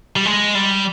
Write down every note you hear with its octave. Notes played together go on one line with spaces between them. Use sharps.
G3
G#3
G3